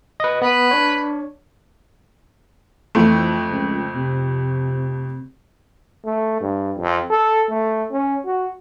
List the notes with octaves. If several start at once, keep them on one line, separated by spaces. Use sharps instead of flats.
B4 D#5
B3 B4
D4 C#5
F2 E3 A3
C#2
C3
A3
G2
F2
A4
A3
C#4
F#4